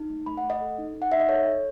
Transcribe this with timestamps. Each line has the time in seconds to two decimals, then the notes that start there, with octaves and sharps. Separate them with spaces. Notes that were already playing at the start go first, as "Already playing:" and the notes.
Already playing: D#4
0.09 A3
0.26 A3 B5
0.37 F#5
0.43 A3
0.50 D#5
0.61 A4
0.78 D#4
0.94 D#4
1.02 F#5
1.12 D#4 E5
1.20 D#5
1.28 A4 C#5
1.45 A4